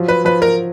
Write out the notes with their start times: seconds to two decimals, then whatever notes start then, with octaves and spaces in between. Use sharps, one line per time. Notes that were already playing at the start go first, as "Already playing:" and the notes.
Already playing: F3 F#3
0.08 B4
0.25 F3 B4
0.42 A#4